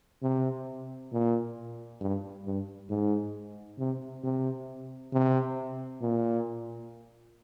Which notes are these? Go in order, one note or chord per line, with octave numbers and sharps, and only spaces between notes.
C3
A#2
G2
G2
G#2
C3
C3
C3
A#2